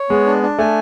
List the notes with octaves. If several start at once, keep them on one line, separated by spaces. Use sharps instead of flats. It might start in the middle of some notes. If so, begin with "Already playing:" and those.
Already playing: C#5
G#3 B3
D4
D4
A3 G#5